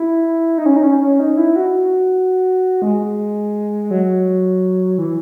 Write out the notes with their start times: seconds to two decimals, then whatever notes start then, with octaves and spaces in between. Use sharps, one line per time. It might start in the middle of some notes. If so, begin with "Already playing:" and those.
Already playing: E4
0.58 D#4
0.66 C#4
0.76 D#4
0.83 C#4
1.02 C#4
1.20 D#4
1.37 E4
1.56 F#4
2.82 G#3
3.91 F#3
4.98 E3